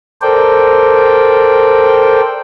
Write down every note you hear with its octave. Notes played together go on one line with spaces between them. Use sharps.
A4 A#4 C5 D5 G5